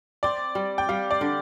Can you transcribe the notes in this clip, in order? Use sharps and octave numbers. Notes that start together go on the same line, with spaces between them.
C4 D5
G3
G5
G3 F5
D5
D3